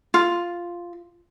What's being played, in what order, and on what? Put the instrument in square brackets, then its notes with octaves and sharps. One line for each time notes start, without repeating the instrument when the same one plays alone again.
[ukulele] F4